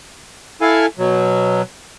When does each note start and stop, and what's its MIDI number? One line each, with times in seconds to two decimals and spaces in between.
0.61 0.86 64
0.61 0.86 69
0.61 0.86 77
0.61 0.86 80
0.99 1.62 47
0.99 1.62 54